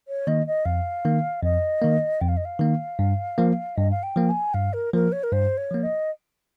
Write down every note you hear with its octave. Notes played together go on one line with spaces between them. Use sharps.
C#5
D#3 A#3 D#5
D#5
F2 F5
D#3 A#3
F2 D#5
D#3 A#3
F2 G5
F5
D#5
F5
D#3 A#3
G2
F3 A#3
G2 D#5
F5
G5
F3 A#3
G#5
G2 F5
A#4
F3 A#3 A#4
C#5
A#4
G2 C5
C#5
F3 A#3
D#5